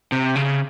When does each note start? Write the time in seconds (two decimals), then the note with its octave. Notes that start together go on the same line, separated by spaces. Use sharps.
0.12 C3
0.35 C#3